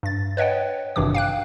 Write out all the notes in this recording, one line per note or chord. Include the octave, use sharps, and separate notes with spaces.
G2 A6
B4 C#5 D#5 F#5 G5
G#1 G2 C3 E3 D6
F5 G5 F#6